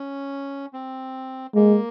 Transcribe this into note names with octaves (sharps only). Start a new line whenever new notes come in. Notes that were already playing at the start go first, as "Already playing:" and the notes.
Already playing: C#4
C4
G#3 A#3